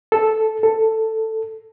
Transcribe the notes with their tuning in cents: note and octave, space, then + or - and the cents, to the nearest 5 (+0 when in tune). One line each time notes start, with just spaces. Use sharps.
A4 -5
A4 +10